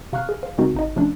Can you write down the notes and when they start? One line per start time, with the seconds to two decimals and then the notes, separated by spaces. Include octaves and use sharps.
0.13 C3 F5 A#5 C#6 F6 F#6
0.29 G#4
0.43 C5 F5
0.58 C#3 G#3 C4 D#4 F#4 A#4
0.74 G#1 D#4 D#5
0.96 C3 F3 A3 C#4 D4